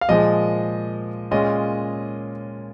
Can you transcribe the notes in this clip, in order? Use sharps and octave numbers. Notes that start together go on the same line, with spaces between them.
F5
A#2 F3 G#3 D#5
A#2 G#3 C#4 F4 D#5